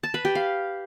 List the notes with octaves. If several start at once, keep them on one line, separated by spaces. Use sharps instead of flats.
A5
B4
G4
F5